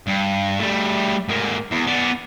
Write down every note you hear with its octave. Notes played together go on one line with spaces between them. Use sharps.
G2
G3 A3
G#2 A#3
E2
B3 D5